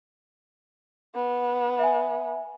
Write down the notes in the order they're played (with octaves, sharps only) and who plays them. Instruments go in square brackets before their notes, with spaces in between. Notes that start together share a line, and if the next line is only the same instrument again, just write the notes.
[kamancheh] B3
[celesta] E5 G#5